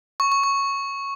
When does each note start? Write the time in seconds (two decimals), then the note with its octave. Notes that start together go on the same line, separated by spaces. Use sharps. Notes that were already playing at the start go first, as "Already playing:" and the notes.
0.20 C#6
0.32 C#6
0.44 C#6